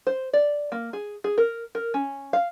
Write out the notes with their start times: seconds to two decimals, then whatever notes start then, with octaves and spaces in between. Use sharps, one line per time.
0.07 C5
0.33 D5
0.72 A#3
0.93 G#4
1.24 G#4
1.38 A#4
1.75 A#4
1.94 C#4
2.33 F5